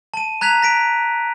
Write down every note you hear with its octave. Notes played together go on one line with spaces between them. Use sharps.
A5 D#7
A#5 F#6 G#6 B6 F7
A#6 B6 D7